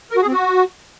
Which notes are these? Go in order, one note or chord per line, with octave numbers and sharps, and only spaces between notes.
A#4
F#4
G#4
C4
F#4